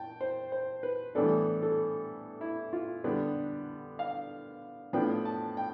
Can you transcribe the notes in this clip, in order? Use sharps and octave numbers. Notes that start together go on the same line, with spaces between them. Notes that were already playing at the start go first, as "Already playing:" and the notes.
Already playing: G5 A5
C5
C5
B4
A2 E3 G3 B3 D4 A4
A4
E4
F4
D3 G3 B3 D4
F5
A2 F3 B3 D4 G5
A5
G5